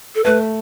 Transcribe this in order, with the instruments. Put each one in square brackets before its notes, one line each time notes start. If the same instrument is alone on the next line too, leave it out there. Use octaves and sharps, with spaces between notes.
[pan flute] A4
[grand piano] A3 [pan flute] B4